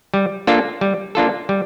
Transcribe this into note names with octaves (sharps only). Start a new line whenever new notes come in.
G3
A#3 D4 F4 A4
G3
A#3 D4 F4 A4
G3